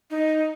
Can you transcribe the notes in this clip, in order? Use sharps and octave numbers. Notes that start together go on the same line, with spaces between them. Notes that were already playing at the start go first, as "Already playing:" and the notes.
D#4